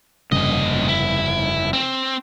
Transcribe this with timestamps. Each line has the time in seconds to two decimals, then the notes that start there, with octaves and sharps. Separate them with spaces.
0.32 F1 G2 A#2 C#3 D#5
0.88 E4
1.73 C4